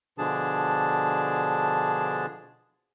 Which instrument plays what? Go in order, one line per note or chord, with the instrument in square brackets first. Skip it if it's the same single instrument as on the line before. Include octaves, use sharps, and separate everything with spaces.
[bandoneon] B2 D3 F3 D4 G#4 A5